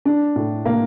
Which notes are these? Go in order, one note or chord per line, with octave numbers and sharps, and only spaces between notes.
D4
A2
A#3